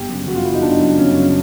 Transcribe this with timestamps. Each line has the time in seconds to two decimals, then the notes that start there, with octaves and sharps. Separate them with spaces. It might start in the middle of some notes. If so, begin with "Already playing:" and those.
Already playing: G1 G4
0.09 F#2 C#3
0.26 G1 F#4
0.35 F4
0.44 F#2 E4
0.48 C#3
0.54 D#4
0.62 G1 D4
0.80 F#2 C#3
0.98 G1 C#4
1.15 F#2 C#3